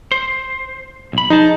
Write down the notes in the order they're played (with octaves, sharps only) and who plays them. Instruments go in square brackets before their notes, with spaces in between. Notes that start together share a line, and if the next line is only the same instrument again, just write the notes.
[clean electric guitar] C5
B1 B5
[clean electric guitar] F3 G#4 A5 [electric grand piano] D#4